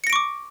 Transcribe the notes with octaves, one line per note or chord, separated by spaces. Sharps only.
C#6 D6 A#6 C#7 D7